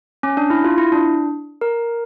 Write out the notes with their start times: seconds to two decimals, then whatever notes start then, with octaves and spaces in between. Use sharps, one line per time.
0.23 C#4
0.37 D4
0.50 E4
0.64 F4
0.78 E4
0.92 D4
1.61 A#4